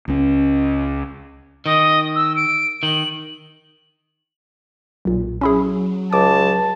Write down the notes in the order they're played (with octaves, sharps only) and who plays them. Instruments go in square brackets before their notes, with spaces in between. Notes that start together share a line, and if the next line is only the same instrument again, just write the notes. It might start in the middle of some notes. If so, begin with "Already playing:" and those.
[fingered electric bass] C#2 C#4
[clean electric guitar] D#3 [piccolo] D#5
[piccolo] E6
D7
[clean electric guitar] D#3 [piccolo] F#7
[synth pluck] B1 A#2
[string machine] F#3 [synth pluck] C#4 E4 G#4
[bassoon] C#2 [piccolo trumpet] A5 [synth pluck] D6